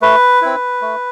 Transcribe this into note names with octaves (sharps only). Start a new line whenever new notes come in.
A3 B4
C4 E4
A3